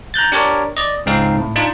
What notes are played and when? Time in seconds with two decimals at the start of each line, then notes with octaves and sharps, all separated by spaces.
0.14 A#5 F#6 G6 A6
0.32 D4 G4 A#4 C#5 D5
0.77 D5 D#5
1.06 C#2 G#2 C4 D#4 F5
1.38 A2
1.56 D4 D#4 F4